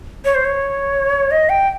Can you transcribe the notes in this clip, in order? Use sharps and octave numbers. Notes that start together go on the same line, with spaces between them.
C#5
C5
C#5
D#5
G5